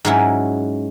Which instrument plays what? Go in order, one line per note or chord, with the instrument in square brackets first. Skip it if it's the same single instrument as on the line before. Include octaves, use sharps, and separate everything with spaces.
[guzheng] G#2 F#3 C#4 E4